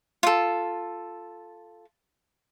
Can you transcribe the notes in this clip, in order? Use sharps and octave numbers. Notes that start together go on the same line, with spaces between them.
F4 A4